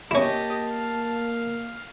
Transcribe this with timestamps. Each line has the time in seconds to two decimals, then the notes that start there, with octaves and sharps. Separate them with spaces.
0.11 A#3 C#4 E4 G4 D#5 A5
0.71 F5